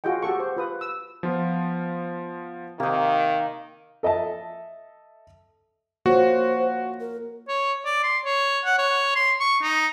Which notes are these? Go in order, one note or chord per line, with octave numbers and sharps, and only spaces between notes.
F4 F#4 G#4 D#5 G5
F#4 G4 A4 C#6
C5
F4 B4 D#6
E6
F3 B3 F4
C3 D#3 A#3 D#4
A4 D#5 E5 A5
A#3 F4 F#4 C5 C#5
A#4
C#5
D5
C6
C#5
F#5
C#5
C6
C#6
D#4